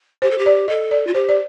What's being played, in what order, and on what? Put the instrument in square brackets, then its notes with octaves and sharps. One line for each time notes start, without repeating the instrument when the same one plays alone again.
[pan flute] G4 [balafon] C5
[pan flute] A4
G4
[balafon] D5
[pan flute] A4 [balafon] D#5
[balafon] D5
[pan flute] F4
[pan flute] G4 [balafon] C5
[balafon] D5